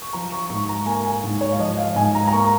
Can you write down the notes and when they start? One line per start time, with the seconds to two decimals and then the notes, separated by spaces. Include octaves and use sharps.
0.02 C#6
0.13 F3 A#5
0.32 C#6
0.50 G#2 C#6
0.69 A#5
0.86 A#3 G#5
1.04 G#5
1.24 G#2
1.41 C#5
1.52 F5
1.59 F3 D#5
1.78 F5
1.96 G#2 G#5
2.15 A#5
2.27 A#5
2.33 A#3 C#6